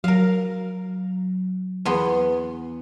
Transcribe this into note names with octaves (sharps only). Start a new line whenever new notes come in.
F#3 A#4 F5
E2 B3 C6